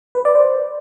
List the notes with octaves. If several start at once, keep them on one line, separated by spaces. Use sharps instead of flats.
B4
D5
C5